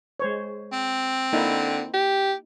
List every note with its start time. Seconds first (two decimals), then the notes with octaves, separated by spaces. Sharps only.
0.20 G#3 C5 C#5
0.72 C4
1.33 D3 A#3 D#4 E4
1.94 G4